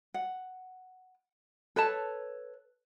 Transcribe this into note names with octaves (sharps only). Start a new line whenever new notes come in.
F#5
A4 B4 C#5 A5